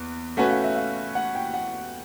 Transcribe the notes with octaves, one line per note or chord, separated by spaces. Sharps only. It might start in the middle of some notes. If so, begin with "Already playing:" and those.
Already playing: E2 B3
A3 C#4 F#4 B4 F#5
F5
E5
F5
F#5
G5
F#5